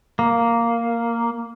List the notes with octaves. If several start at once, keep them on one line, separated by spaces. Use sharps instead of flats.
A#3